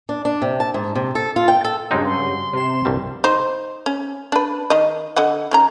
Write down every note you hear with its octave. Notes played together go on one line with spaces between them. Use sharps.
D4
D4
C3
A5
G#2
C3
A4
F4
G5
A4
G2 C#3 F#3 G#3 C4 D#4
C6
C3 E7
C2 G2 G3
D#4 C5
C#4
D4 B4
D#3 D#5
D3 D#5 F#5
D#3 C#4 A#5